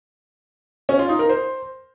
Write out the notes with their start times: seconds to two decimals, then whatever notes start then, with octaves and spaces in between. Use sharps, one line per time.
0.89 C#4
0.99 F4
1.09 D#4
1.19 A#4
1.29 C5